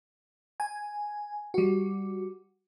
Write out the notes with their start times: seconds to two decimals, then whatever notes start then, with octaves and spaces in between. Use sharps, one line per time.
0.60 G#5
1.54 G3 F#4